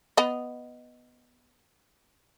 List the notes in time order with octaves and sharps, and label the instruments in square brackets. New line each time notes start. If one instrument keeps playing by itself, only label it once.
[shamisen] B3 D#5